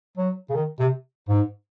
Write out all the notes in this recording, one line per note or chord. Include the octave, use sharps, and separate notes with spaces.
F#3
C#3
D#3
C3
G#2